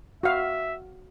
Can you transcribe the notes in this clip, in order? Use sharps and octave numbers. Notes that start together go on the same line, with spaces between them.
F#4 E5 F5